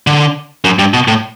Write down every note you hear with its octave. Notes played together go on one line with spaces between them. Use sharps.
D3
F#2
G2
B2
A2